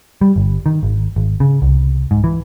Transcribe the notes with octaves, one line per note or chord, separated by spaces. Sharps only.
G3
G1
D#3
G#1
G#1
C#3
C2
G#2
E3